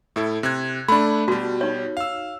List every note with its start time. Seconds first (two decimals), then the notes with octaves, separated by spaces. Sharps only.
0.16 A2 E4 A4
0.43 C3 F#6 G#6
0.88 A3 D4 B5
1.28 B2 G3 F#4 A5
1.61 D#4 C#5
1.97 F5 E6